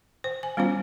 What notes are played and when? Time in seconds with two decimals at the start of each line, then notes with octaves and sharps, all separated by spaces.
0.24 C5
0.43 G#5
0.57 G3 B3 C#4 F4 C5